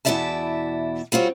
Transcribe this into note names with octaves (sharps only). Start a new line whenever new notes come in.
E2 B2 E4 D5 E5 A5
G3 C4 F4 F#4 C#5